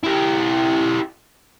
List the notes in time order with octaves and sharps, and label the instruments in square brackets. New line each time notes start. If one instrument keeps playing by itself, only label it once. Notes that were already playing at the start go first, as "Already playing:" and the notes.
[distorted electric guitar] E4 G4